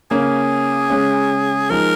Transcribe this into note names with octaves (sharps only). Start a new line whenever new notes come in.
C#3 A#3 C#4 G#4
C#3 G#3 C#4
F3 G#3 D#4 A#4